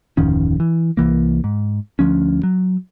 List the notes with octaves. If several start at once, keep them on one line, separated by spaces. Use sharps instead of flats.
D1 F2 D#3 C#4
E3
C2 E3 A#3
G#2
D2 F3 C#4
F#3